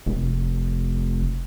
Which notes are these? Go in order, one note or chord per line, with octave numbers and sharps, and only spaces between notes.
F1